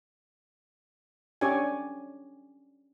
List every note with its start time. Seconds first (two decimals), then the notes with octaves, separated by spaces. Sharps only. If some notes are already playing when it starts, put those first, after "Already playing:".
1.41 C#4 D4 G4 C#5 D5 G#5